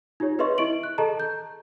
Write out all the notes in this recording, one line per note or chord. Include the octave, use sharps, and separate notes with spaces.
D#4 F4 G4 C#5
G#4 B4 D#5 E5 C6 C#6
E4 D#5 C#6 D7 F#7
F#6
G#4 A4 D#5 A5 A#5
G6